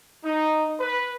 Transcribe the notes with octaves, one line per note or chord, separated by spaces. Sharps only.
D#4
B4